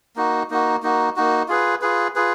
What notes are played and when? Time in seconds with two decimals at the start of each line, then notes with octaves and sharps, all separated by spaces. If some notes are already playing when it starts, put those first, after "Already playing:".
0.16 A#3 D#4 F#4
0.50 A#3 D#4 F#4
0.83 A#3 D#4 F#4
1.16 A#3 D#4 F#4
1.48 F4 G#4 B4
1.81 F4 G#4 B4
2.16 F4 G#4 B4